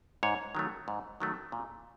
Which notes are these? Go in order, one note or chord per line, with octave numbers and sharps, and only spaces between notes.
G#2 C#5
D#3 F#3 A3
G#2
D#3 F#3 A3
A#2